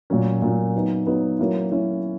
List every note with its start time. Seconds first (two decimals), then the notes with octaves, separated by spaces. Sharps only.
0.10 A#2 F#3 C#4
0.42 A#2 F#3 C#4
0.74 F#3 B3 D#4
1.07 F#3 B3 D#4
1.39 F#3 A#3 C#4 E4
1.71 F#3 A#3 C#4 E4